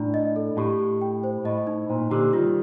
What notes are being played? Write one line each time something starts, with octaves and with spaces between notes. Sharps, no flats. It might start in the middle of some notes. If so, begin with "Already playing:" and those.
Already playing: A2 D4 D5 A#5
D#5
A4
A2 G4
G4
G5
C5
A2 D#5
D#4
A#2 C5
A#2 D3 G4
D#3 G3 F4